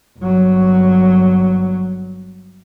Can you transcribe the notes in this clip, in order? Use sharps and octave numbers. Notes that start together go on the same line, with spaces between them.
G1 F#3